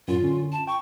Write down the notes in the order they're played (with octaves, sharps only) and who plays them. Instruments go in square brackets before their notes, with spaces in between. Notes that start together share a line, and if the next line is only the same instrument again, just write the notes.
[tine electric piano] F#2 A2 [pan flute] F4
[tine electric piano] D3 C#4
[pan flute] A5
[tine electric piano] G5 [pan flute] C#6